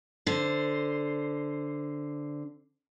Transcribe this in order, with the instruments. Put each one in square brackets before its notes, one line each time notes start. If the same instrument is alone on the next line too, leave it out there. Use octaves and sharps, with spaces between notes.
[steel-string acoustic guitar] D3 C5